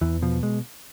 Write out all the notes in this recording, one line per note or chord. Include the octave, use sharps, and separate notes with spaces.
E2 E3
B2 F3
G#3